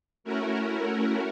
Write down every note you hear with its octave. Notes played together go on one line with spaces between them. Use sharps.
A3 C#4 E4 F#4 A#4